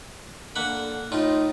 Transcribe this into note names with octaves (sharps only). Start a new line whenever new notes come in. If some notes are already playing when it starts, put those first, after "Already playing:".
D3 A#3 F#5 B5
A2 D#4 F4